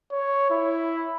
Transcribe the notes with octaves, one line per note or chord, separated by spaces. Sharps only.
C#5
E4